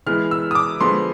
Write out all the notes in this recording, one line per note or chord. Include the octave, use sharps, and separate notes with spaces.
E3 G#3 B3 F6
E6
D#6
D6
D3 F3 G#3 B3 C6